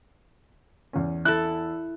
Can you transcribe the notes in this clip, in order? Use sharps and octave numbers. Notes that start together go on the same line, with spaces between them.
E2 C#4
E4 A4 F#6